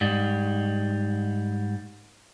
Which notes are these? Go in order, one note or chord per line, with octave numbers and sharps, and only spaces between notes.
G#2 G3